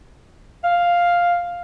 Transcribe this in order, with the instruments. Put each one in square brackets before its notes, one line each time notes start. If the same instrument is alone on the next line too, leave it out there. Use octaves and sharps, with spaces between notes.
[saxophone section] F5